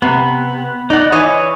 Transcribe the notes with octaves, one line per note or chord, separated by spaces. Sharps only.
C3 B3
D#4 D5 F#5
E3 B4 C#5 D#5 G#5